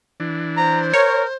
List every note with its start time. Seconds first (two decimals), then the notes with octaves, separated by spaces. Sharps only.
0.20 E3 D4
0.57 C5 A#5
0.93 A#4 C#5